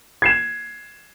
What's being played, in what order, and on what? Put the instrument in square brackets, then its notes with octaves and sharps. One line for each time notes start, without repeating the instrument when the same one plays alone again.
[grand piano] G#6 C7 E7